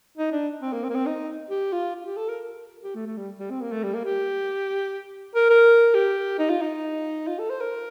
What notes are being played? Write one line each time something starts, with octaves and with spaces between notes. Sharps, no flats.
D#4
D4
C4
A#3
C4
A#3
C4
D#4
G4
F4
F4
G4
A4
A#4
G4
A3
A3
G3
G3
C4
A#3
A3
G3
A#3
G4
A#4
A#4
G4
D#4
F4
D#4
F4
A4
C5
A#4